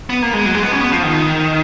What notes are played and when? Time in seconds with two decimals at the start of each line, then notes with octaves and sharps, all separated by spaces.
0.10 B3
0.22 A#3
0.33 G#3
0.45 F#3
0.55 G#3
0.63 B3
0.72 C#4
0.81 B3
0.92 F3
1.03 D#3